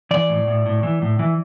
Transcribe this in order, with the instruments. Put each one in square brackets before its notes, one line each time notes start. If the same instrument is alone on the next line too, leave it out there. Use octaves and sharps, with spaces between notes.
[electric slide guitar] E3 D5
A2
A2
A2
E3
A2
E3